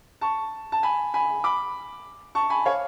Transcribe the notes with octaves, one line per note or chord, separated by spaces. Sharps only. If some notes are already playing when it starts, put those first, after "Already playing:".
A5 C#6
A5
G#5 B5
G#5 B5
B5 D6
A5 C#6
G#5 B5
C#5 F5